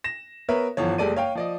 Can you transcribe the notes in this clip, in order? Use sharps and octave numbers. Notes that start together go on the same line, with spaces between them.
A#6 E7
B3 A#4 B4 C#5 E5
G1 E3 F3 C#5
F#1 G3 G#3 A4 D5 D#7
C#5 F5 G5
F3 D5 D#5